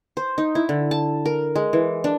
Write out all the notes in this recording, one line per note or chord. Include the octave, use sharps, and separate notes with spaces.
C5
D#4
E4
D3
A5
A#4
G#3
E3
D4